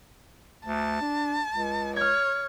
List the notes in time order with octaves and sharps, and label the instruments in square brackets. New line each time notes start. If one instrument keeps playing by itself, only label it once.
[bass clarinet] D2 [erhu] A5
[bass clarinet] D4
C#2
[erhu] C#5 [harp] F6 G#6